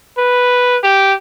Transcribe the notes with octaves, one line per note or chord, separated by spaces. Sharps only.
B4
G4